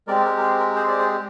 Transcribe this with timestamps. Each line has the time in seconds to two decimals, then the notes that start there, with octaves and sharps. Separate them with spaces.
0.07 G#3 C4 G4 A#4 D5
0.25 A#4
0.38 A#4
0.42 G#4
0.59 A#4
0.76 G#4 C5
0.88 D5
0.98 G#4 C5